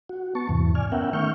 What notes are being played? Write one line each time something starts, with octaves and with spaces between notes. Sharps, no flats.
F#4
B3 A5 C#6
E2 G#2 C3 E3
D5 G#5 F6
B3 C#4 A#4 E5 F#5 G5
D#3 A3 E5 C#6 F6 G6